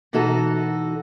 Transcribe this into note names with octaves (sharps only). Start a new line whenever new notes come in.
B2 E3 D#4 F#4 A4